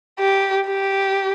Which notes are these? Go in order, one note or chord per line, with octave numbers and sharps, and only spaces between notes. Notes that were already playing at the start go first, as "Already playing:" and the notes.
G4
G4